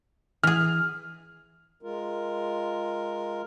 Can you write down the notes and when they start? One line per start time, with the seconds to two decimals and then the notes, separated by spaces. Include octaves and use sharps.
0.44 E3 G#4 F6
1.83 G#3 F4 A#4